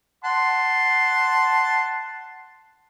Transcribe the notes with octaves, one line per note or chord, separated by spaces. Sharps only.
F#5 A5 C6